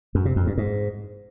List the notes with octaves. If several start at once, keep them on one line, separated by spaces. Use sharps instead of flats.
F#2
C3
F2
G2
G#2